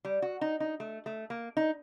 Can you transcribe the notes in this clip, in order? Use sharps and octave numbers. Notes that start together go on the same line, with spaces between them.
G3
F#4
D#4
D#4
A3
A3
A#3
D#4